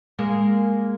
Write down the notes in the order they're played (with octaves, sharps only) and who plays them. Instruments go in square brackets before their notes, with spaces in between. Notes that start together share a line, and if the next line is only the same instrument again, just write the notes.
[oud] G#3 A#3